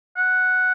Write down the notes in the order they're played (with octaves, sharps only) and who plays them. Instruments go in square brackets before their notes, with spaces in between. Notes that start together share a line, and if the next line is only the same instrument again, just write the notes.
[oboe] F#5